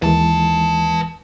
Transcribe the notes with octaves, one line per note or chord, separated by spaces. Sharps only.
D#2 D#3 E3 G#3 B4 A5